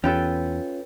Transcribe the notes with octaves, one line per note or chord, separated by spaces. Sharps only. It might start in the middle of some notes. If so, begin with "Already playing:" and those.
E2 C#4 F4 A4 B4 G5